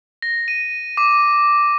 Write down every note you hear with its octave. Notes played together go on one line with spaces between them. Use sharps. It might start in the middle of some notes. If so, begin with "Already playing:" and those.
A#6
D#7
D6